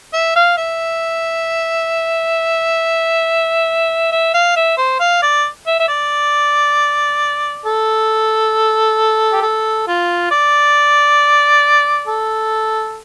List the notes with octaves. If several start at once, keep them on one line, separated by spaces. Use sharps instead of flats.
E5
F5
E5
E5
F5
E5
C5
F5
D5
E5
E5
D5
A4
G4
A4
F4
D5
A4